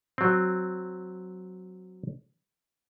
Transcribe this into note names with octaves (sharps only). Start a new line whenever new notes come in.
F#3 C4